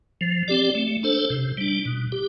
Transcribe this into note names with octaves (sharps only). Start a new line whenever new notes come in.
F3
C4 G4 D5
A3
D4 A4 C5
C3
G3 D4
B2
G4